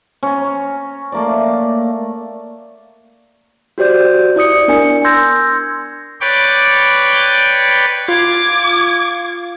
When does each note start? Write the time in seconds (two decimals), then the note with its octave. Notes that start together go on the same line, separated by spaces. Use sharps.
0.23 C#4 A#5
1.12 A3 A#3 D5
3.78 F#4 G4 C5 D5 G6
4.36 E4 D5 D#6 C#7
4.68 B3 D4 A#4 G#5 C#7
5.05 C6 E6 G6 G#6 A#6
6.21 B4 C#5 D5 G5 D6
8.08 F4 D6 G#6